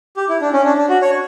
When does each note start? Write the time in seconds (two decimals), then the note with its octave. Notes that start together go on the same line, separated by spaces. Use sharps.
0.17 G4
0.29 E4
0.41 D4
0.53 C#4
0.65 D4
0.77 D4
0.89 F#4
1.02 C#5